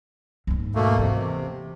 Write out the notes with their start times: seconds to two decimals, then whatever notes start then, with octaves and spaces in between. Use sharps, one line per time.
0.47 D#2 G#2
0.75 B2 A3 A#3
0.99 C3 E3